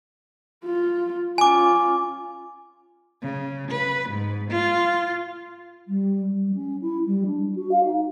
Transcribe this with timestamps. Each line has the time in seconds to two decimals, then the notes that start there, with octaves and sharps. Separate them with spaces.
0.65 F4
1.38 C#4 F4 G#5 D6
3.22 C#3
3.71 B4
4.09 G#2
4.51 F4
5.87 G3
6.34 G3
6.54 C#4
6.81 E4
7.06 G3
7.26 D4
7.55 F#4
7.71 F5
7.84 D#4